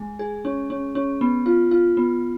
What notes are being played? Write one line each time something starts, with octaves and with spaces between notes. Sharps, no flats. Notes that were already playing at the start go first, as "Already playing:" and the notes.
Already playing: G#3
G#4
C#4
C#4
C#4
B3
F4
F4
B3